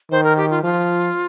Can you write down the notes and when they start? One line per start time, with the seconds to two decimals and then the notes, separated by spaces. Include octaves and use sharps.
0.11 D#3 C5
0.24 A#4
0.37 G4
0.50 F4
0.63 F3 F4